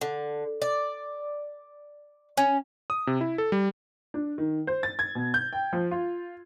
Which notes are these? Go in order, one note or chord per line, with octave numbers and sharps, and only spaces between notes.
D3
D5
C#4
D#6
C3
E4
A4
G3
D4
D#3
C5
A6
G#6
B2
G6
G5
F3
F4